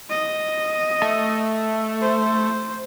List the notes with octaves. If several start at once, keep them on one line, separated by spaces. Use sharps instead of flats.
D#5
A3
C5